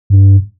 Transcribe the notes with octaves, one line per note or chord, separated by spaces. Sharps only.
G2